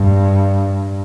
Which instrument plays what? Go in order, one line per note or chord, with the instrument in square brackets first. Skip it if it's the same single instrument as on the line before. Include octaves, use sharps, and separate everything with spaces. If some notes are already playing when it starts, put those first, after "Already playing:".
Already playing: [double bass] G2